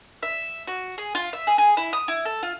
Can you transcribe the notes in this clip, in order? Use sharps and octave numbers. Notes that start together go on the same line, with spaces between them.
E5
F#4
G#4
F4
E5
G#4
G#4
E4
D#6
E4
A4
F4